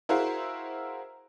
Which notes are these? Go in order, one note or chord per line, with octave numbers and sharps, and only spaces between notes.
E4 F#4 G#4 A#4 C5 F5